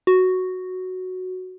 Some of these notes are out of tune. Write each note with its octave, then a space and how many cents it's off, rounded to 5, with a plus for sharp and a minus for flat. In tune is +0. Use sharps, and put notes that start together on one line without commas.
F#4 +0